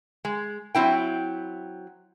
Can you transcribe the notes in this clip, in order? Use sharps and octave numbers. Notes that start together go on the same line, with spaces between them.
G#3
F#3 C4 E4 G5